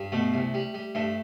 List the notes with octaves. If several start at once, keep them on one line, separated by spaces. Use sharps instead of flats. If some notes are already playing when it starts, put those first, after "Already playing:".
Already playing: G2
B2 A3
C2
G3
G3
G2 A3